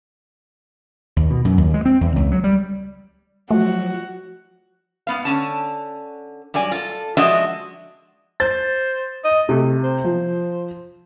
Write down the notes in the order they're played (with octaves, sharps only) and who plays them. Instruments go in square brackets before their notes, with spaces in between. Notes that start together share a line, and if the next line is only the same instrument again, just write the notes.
[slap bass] D#2
B2
F#2
D#2
G#3
C4
E2
C#2
F#3
G3
[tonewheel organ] F3 F#3 [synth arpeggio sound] A3 [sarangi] F#4
[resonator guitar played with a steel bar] G#2 B3 F5
D3 C#4 A5
G2 F#3 D5 G#5
F4 A4
F3 G#3 D4 F#4 D#5 E5
[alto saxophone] C5 [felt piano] A6
[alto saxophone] D#5
[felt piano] C3 [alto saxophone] A3
[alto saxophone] C5
[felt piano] F3